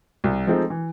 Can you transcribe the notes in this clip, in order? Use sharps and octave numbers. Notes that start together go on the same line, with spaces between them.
C2
F3 G#3 A3 C4 D#4
E3